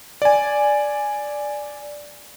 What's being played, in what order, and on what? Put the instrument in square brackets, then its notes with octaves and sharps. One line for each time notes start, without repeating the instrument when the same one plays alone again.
[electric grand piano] D5 G#5